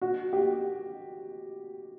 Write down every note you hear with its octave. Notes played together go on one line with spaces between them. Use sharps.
F#4
G4